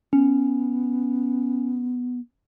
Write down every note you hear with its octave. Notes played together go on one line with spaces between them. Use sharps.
B3 C#4